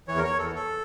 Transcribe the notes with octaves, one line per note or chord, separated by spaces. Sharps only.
E2 E3 C#5
A#4
C#5
E2 E3 A4
A4